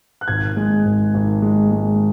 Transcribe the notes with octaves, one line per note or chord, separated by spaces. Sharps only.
F#6
G#1 G#6
G#3
G#1
G#1
G#3
G#3